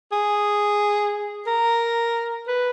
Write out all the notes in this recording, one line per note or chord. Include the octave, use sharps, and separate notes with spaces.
G#4
A#4
B4